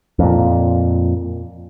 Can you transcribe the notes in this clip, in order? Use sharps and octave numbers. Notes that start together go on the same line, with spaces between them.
F2 A#2